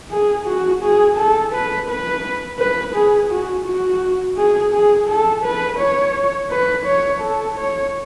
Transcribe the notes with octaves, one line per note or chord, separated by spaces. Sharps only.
G#4
F#4
G#4
A4
B4
B4
B4
G#4
F#4
F#4
G#4
G#4
A4
B4
C#5
B4
C#5
A4
C#5